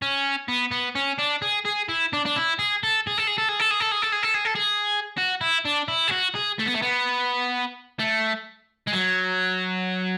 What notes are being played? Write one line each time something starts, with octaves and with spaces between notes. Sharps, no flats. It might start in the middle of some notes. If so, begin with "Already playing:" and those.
C#4
B3
B3
C#4
D4
G#4
G#4
E4
D4
D4
E4
G#4
A4
G#4
A4
G#4
A4
G#4
A4
G#4
A4
G#4
A4
G#4
A4
G#4
A4
G#4
F#4
E4
D4
E4
G#4
F#4
G#4
A3
B3
A3
B3
A3
G#3
F#3